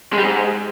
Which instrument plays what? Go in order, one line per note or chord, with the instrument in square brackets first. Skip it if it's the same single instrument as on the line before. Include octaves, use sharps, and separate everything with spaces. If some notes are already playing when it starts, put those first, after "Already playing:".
[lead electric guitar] G#3
G3
G#2